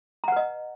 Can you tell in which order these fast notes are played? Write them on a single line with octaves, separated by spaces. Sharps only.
A#5 F#5 B4 D#5